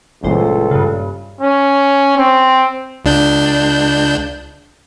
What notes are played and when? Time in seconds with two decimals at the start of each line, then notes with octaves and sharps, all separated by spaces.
0.24 G1 C#2 A#2 E3 A4 C5
0.71 G2 C#3
1.41 C#4
2.18 C4
3.05 C#2 D4 G6